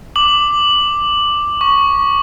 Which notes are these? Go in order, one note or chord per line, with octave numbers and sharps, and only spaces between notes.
D6 F#7
C#6